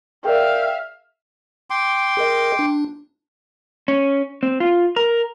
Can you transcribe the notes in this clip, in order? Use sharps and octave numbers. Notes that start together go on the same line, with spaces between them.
G#4 A#4 D5 E5 F5 G5
G5 C6 D6
G#4 A#4 D#5
D4
C#4
C4
F4
A#4